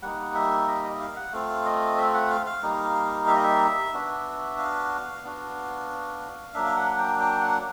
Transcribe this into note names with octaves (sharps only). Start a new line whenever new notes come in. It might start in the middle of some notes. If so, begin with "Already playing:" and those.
G3 A#3 D#4 F#5
E5
D#5
D#5
E5
F5
F#5
A3 C4 F4 F5
D#5
E5
F#5
F5
F5
G3 A#3 D#4
E5
D#5
E5
B3 D4 F#4
F5
B3 D4 F#4
F#3 A#3 D4 E5
F5
F#5
G5
G5
F#5